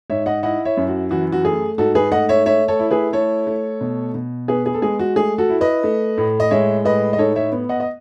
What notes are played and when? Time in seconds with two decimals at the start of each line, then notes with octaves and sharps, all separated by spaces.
0.10 G#2 C#5 E5
0.26 D#5 F#5
0.43 E4 D#5 F#5
0.65 C#5 E5
0.77 F#2
0.88 F#4
1.11 E3 F#4
1.32 F#4
1.44 A3 G#4
1.78 G#2 F#4 A4
1.95 G#4 B4
2.11 A3 D#5 F#5
2.29 C#5 E5
2.46 A3 C#5 E5
2.68 A4 C#5
2.79 E4
2.91 G#4 B4
3.13 A3 A4 C#5
3.47 A3
3.81 B2
4.14 B2
4.48 B3 G#4 B4
4.66 G#4
4.74 A4
4.82 G#3 G#4
4.99 F#4
5.16 A3 G#4
5.38 F#4 A4
5.50 E4
5.61 B4 D#5
5.83 A3
6.18 A2
6.40 D#5
6.51 G#3 C#5 E5
6.85 A2 B4 D#5
7.13 D#5
7.18 D#4 A4 C#5
7.36 C#5 E5
7.52 B3
7.69 D#5 F#5
7.80 D#5